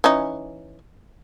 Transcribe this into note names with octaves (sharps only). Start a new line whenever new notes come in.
E3 C#4 D#4